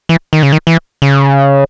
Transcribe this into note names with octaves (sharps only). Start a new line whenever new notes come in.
E3
D#3
C#3
D#3
E3
C#3